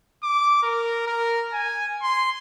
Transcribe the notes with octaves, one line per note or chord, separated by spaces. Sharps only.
D6
A#4
A#4
G#5
C6